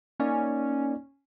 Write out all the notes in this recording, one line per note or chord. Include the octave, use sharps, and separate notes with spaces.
A#3 C#4 D#4 D5